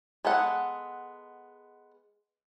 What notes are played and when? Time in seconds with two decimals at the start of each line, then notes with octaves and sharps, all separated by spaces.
0.25 G#3 B3 A4 F#5